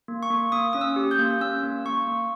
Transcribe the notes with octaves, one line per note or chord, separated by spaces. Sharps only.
A#3
C#6
A#3
A#3 D#6
C#4 D#6
E6
G4
G6
A#3
C#4 E6
A#3
A#3 C#6
A#3